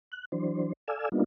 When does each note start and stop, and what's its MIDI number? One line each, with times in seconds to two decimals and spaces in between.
0.12 0.25 90
0.32 0.73 52
0.32 0.73 54
0.32 0.73 62
0.32 0.73 72
0.88 1.09 69
0.88 1.09 74
0.88 1.09 77
0.88 1.09 80
0.88 1.09 88
1.12 1.24 55
1.12 1.24 58
1.12 1.24 59
1.12 1.24 62
1.12 1.24 63
1.12 1.24 65